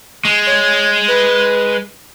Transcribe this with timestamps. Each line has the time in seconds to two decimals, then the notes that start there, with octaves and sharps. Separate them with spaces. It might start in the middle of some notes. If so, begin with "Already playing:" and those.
0.25 G#3
0.47 C#5
1.08 B4